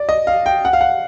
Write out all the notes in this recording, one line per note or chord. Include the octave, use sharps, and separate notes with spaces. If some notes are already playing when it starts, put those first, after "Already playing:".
Already playing: D5
D#5
F5
G5
F#5
F5
F#5